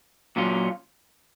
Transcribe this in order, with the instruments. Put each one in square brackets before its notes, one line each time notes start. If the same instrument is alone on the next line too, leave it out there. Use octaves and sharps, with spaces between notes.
[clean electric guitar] A#2 F#3 C#4 F4